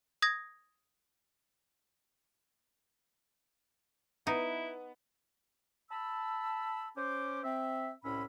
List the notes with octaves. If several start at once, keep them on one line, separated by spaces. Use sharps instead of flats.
D#6 G#6 A#6
B3 D#4 E4
A5 B5 E6
C#4 C5 D6
C4 E5
C2 A2 C#4 E5 B5